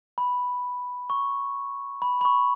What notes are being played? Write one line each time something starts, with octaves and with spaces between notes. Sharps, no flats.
B5
C#6
B5
B5
C#6